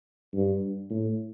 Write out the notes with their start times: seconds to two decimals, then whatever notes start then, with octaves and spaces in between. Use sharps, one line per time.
0.34 G2
0.90 A2